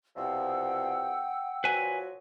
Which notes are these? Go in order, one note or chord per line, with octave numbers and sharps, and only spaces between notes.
C2 B2 F3 F#5 G5 E6
A#2 F3 F#3 B4 G#5